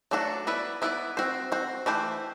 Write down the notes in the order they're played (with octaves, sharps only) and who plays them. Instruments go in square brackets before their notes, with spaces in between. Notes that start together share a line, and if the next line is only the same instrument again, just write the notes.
[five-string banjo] F#3 A3 D4 F#4 A4
B3 E4 B4 D5
B3 E4 B4 D5
C4 F#4 C5
C4 F#4 C5
E3 A3 E4 G4 C5